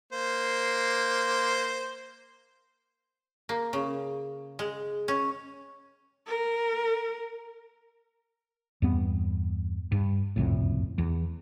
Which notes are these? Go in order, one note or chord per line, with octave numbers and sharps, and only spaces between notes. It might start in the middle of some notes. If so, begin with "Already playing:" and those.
A#3 C5
A#3
C#3
G#3
C#4
A#4
E2 G2 B3
G2
F#1 C2 F2 A2
E2